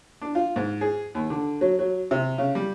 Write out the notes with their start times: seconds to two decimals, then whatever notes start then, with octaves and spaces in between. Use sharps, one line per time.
0.22 D4
0.35 F4
0.56 G#2
0.81 G#4
1.15 D#2
1.30 D3
1.61 F#3
1.79 F#3
2.11 C3
2.38 C#3
2.55 G3